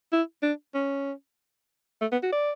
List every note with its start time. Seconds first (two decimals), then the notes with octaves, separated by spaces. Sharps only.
0.12 E4
0.43 D4
0.74 C#4
2.01 A3
2.12 B3
2.23 F#4
2.32 D5